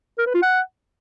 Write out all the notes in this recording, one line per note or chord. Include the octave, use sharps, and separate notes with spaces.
A#4
B4
F4
F#5